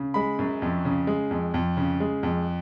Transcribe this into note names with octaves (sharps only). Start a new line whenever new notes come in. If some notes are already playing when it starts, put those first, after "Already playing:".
Already playing: C#3
G#3 B5
F#2
F2
C#3
G#3
F2
F2
C#3
G#3
F2